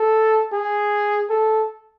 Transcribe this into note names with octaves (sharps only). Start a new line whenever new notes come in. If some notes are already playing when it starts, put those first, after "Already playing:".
Already playing: A4
G#4
A4